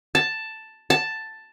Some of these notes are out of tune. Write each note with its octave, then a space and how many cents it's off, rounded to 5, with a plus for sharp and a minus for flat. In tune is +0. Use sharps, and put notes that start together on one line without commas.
A5 +5
A5 +5